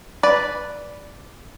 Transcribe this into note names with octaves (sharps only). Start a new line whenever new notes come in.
B4 D5